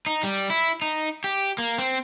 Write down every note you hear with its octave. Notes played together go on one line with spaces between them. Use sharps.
D#4
G3
E4
D#4
G4
A#3
C4